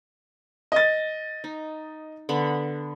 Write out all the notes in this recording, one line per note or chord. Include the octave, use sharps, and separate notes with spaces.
D#5 A6
D#4
D3 B3 B5